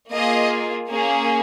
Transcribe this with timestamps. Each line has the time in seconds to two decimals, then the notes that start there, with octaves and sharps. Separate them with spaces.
0.11 A#3 F4 G#4 D#5
0.88 A#3 C#4 G#4